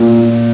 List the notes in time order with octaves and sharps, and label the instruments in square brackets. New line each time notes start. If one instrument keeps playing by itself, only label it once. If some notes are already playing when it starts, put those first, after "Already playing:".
Already playing: [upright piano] A#2